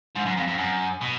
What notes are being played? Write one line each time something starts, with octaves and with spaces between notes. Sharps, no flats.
G#2
F#2
F2
F2
F#2
B2